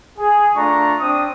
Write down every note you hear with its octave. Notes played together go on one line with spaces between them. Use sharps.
G#4
A3 D4 F4 A#5 C#6
C4 D4 D#6